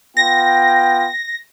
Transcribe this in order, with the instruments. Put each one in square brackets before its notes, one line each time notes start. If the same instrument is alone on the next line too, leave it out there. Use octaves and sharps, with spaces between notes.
[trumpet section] B3 F4 G5 [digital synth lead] A#6